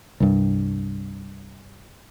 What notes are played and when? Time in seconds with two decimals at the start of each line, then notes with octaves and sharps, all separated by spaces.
0.20 C2 G2